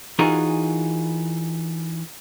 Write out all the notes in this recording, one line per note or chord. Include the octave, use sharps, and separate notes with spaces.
E3 D#4 F4 F#4 G#4 A#4